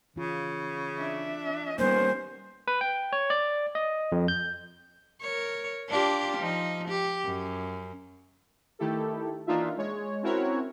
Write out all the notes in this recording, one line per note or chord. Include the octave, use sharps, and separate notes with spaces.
C#3 E3 F4
D4 E5
D#3 G3 A#3 B3 C#4 C5
B4
G5
C#5
D5
D#5
F2
G6
A#4 C#5
D4 F4 G4
F3 D#4
G4
F#2
D#3 A3 E4 G4 A4
E3 A#3 D4 D#4 F4 E5
G#3 C#5
C4 C#4 E4 F#4 A#4 C#5